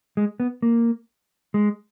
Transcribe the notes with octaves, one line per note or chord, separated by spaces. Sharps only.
G#3
B3
A#3
G#3